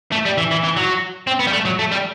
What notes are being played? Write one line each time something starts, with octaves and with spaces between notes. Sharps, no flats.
A3
G3
E3
E3
E3
F#3
C4
B3
G3
A3
F#3
A3
G3